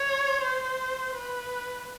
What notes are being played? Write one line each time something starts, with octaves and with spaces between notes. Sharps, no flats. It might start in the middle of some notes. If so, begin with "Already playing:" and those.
Already playing: C#5
C5
B4